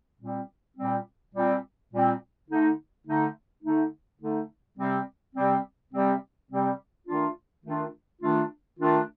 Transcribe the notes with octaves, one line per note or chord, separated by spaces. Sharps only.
A#2 G3 C4
A#2 G3 C4
A#2 G3 C4
A#2 G3 C4
D3 A3 D#4
D3 A3 D#4
D3 A3 D#4
D3 A3 D#4
C3 G3 C4
C3 G3 C4
C3 G3 C4
C3 G3 C4
D#3 A3 D4 F4
D#3 A3 D4 F4
D#3 A3 D4 F4
D#3 A3 D4 F4